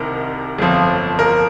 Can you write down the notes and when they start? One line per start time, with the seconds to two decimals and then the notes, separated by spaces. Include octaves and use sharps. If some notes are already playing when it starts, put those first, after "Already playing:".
Already playing: C2 C3 D#3 A#4
0.59 G1 F2 F3 C4
1.19 A#4